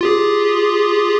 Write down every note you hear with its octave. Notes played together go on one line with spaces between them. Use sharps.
F4 G4 G#4